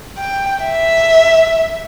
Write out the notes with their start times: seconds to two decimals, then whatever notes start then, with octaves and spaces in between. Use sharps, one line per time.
0.18 G5
0.64 E5